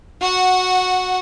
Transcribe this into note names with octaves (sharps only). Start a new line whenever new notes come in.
F#4 F#5